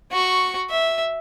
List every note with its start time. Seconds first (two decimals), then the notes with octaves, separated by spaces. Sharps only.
0.12 F#4 C#6
0.70 E5